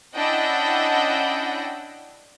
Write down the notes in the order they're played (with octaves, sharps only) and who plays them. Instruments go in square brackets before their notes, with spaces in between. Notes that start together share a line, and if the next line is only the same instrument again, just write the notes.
[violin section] C#4 D4 E4 D#5 F#5 G5